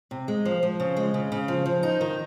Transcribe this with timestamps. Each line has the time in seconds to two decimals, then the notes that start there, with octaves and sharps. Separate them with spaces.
0.11 C3
0.28 G#3
0.45 F3
0.63 F3
0.80 C#3
0.96 G#3
1.14 C#3
1.32 C#3
1.48 F3
1.66 F3
1.83 D#4
2.01 D#3